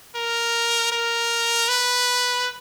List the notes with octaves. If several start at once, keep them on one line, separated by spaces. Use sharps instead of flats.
A#4
A#4
B4